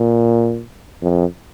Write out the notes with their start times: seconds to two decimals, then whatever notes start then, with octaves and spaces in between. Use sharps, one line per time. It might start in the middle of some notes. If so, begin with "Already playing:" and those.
Already playing: A#2
1.02 F2